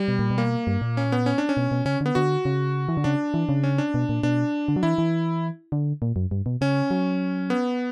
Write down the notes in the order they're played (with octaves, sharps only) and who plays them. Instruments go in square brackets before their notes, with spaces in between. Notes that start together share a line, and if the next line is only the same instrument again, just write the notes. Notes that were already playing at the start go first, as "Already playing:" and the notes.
Already playing: [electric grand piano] G3
[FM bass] B2
A#2
B2
[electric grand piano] A#3
[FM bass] G2
A#2
[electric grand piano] C#4
B3
C#4
D4
C#4
[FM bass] B2
B2
[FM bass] C#3 [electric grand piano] C#4
[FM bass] D3 [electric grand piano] B3
[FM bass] D3 [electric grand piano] F#4
[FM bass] C#3
E3
D3
[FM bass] C#3 [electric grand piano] D4
[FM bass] E3
C#3
[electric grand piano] C#4
D4
[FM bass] B2
A#2
[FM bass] B2 [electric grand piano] D4
[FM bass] D3
F#3
[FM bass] E3 [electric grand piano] E4
[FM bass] E3
D3
A#2
F#2
G2
B2
[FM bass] C#3 [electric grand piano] C#4
[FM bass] F#3
[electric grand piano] B3